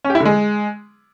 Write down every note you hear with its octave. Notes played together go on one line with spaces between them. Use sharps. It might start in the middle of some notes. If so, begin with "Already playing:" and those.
C#4
G4
E4
D3
G#3